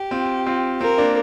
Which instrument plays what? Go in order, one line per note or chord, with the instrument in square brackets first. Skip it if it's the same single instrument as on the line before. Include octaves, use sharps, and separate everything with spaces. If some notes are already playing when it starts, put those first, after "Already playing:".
Already playing: [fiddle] G4
[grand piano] C4 F4
C4 F4
[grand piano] C4 F4 [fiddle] A#4
[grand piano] A#3 D4